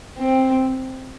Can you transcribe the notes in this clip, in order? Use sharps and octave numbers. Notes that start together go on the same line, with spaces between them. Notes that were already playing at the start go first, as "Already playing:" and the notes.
C4